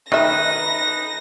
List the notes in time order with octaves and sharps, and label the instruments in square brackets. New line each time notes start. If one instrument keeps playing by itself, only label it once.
[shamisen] D#3 E5 [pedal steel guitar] D#4 B4 [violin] A#6